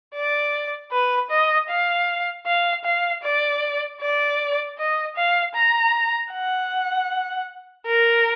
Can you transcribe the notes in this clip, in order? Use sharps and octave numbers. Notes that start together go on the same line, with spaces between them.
D5
B4
D#5
F5
F5
F5
D5
D5
D#5
F5
A#5
F#5
A#4